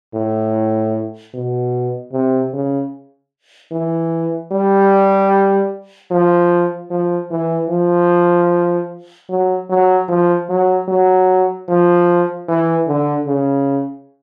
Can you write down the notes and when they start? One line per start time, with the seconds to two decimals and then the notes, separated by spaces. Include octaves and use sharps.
0.14 A2
1.34 B2
2.13 C3
2.53 C#3
3.72 E3
4.52 G3
6.11 F3
6.91 F3
7.31 E3
7.70 F3
9.30 F#3
9.70 F#3
10.08 F3
10.49 F#3
10.88 F#3
11.69 F3
12.48 E3
12.87 D3
13.27 C#3